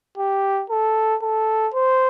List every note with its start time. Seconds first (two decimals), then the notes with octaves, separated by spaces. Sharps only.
0.18 G4
0.70 A4
1.22 A4
1.74 C5